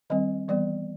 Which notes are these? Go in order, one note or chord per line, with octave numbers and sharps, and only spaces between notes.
D#3 G3 C4 D#5
E3 G3 B3 D5